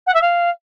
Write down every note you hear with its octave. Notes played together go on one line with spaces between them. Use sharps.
F#5
E5
F5